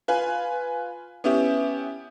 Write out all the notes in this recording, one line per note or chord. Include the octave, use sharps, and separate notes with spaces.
F4 B4 G#5
B3 C#4 E4 G4